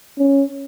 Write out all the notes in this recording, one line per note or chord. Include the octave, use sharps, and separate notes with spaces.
C#4